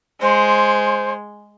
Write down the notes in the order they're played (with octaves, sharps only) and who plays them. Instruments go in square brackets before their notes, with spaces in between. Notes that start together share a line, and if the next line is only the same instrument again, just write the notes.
[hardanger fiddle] G#3 [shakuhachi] C5